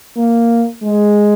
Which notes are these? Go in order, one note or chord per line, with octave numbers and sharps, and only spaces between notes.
A#3
G#3